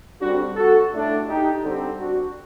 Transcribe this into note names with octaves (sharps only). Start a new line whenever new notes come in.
D3 G3 C4 D4 F#4
F#4 A4
A2 A3 D4
D#4 G4
D3 G3 C4
D4 F#4